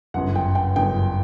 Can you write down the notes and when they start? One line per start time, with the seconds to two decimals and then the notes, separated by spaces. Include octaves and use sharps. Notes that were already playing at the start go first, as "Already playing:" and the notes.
0.14 G1 F#2 C#3 F#5
0.35 G5
0.55 G5
0.76 G1 F#2 C#3 G5